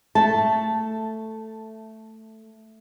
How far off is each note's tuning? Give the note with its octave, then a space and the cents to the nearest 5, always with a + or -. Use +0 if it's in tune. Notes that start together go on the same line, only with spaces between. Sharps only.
A3 +5 A5 +0